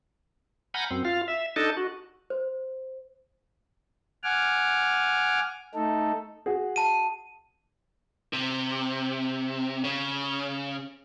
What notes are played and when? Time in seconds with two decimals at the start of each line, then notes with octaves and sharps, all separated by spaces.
0.74 F#5 G#5 A#5 B5 F6 G6
0.91 F#2 C4
1.05 F4 F5
1.28 E5
1.56 D4 D#4 A4 D#5 A5
1.77 F#4
2.30 C5
4.23 F#5 G#5 D6 F6
5.75 A3 D#4 A4
6.46 F#4 G#4
6.76 A5 D#7
8.33 C3
9.84 C#3